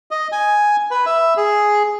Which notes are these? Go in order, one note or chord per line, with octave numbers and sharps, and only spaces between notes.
D#5
G#5
B4
E5
G#4